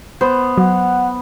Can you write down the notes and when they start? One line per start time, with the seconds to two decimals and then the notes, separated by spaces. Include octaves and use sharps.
0.21 B3 C5
0.58 F#3 F#5